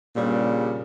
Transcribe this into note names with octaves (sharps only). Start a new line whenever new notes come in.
G2 A#2 C#3 G3